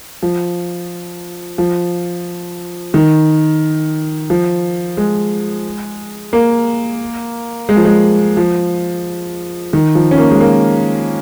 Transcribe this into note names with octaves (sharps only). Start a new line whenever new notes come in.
F3
F3
D#3
F3
G#3
A#3
G#3
F3
G#3
F3
D#3
F3
C#4
A#3
G#3
A#3